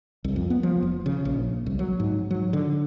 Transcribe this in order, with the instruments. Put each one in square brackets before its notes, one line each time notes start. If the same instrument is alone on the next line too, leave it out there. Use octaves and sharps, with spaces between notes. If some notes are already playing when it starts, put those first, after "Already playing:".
[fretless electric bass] C2
F2
B3
F3
F#1
C#3
A#1
C2
F#3
G#2
F#3
D3